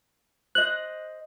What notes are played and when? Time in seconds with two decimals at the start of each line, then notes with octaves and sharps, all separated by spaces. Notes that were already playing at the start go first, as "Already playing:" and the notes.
0.55 C5 D#5 F#6